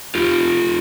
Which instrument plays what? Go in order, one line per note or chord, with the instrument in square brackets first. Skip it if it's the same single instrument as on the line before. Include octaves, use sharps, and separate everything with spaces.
[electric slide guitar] F4 G4